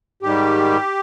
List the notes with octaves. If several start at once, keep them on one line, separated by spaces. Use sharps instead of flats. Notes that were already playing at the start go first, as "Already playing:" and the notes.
G#2 D#3 G3 G4